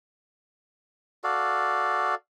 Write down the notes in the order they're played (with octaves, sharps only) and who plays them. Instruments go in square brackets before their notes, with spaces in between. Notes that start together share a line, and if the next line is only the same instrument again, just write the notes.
[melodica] F#4 A4 D5 F5